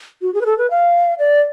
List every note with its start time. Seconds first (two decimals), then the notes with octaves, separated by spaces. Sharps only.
0.22 F#4
0.34 G#4
0.41 B4
0.46 A4
0.58 B4
0.71 F5
1.19 D5